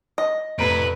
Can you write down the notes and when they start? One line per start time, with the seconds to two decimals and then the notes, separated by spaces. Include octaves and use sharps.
0.18 D#5
0.59 F1 A2 B4 A#5 D7